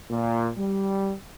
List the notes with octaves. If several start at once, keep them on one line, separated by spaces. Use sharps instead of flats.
A#2
G3